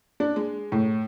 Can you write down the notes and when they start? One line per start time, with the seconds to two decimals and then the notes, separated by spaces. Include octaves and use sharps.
0.20 D4
0.36 G#3
0.72 A2